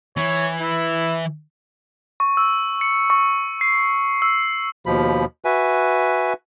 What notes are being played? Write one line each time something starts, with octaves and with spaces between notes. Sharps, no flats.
E3 C#5
E4
C#6
E6
C#7
C#6
C7
E6
D#2 B2 F3 B5
F#4 B4 E5 G#5